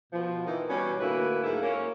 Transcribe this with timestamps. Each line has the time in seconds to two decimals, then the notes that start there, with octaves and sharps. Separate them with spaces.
0.13 B2 F3
0.47 D#3 E3 D#4
0.69 B2 G3 C#4
1.00 D2 A2 A#3 E4 F#4 B4
1.44 G#2 F#3 A3 A#3 E4
1.63 A#3 C#4